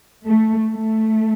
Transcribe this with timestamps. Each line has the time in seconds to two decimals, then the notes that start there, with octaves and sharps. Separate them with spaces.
0.25 A3
0.69 A3